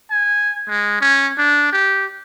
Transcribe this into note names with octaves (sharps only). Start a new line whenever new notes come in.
G#5
G#3
C#4
D4
G4